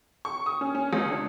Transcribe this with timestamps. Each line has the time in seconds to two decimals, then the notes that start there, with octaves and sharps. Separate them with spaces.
0.25 C#6
0.46 D#6
0.61 C#4
0.75 C#4
0.93 C#2
1.11 D4